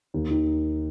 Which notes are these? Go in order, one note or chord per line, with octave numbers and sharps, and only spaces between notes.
D#2
D#3